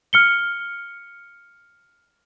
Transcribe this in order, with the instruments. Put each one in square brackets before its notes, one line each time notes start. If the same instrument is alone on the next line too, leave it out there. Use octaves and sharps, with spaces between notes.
[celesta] F6 C#7 G7